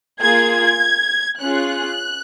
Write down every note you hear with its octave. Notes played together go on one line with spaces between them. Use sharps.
A#3 F4 G#4 G#6
C#4 F4 G#4 F#6